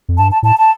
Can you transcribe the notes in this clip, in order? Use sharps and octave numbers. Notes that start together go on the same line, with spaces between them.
F2
G2 A5
A5
A2 A5
A5